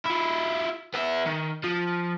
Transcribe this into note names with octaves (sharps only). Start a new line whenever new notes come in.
E4 F4
B3 E5
D#3
F3